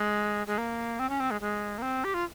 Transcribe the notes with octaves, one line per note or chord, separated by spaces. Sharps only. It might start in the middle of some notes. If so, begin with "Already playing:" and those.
Already playing: G#3
G#3
A#3
C4
C#4
C4
G#3
G#3
A#3
C4
G4
F4